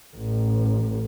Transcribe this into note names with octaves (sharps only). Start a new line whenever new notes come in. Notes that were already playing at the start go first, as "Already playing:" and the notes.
A1